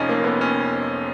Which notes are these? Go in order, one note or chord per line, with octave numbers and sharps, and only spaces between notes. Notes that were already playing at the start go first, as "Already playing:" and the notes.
Already playing: F1 F2 F3 C#4 D#4
A#3
B3
C#4